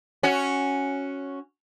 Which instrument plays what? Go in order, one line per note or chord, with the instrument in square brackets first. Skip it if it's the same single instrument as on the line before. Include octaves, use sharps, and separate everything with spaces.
[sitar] C#4 F#4